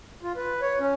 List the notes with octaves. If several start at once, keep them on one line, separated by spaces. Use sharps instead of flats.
F4
B4
C#5
C#4